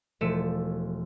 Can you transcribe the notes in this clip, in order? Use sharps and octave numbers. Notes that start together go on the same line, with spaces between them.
E1 F3 A3 E6 C#7 E7